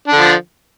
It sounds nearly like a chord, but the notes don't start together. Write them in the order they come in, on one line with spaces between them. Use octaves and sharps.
D4 D3 F3